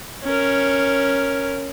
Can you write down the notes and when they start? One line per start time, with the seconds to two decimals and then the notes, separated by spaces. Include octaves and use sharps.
0.23 C#4 A#4